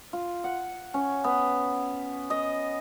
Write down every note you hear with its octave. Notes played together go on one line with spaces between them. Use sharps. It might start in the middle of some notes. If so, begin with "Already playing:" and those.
F4
F#5
C#4
B3
D#5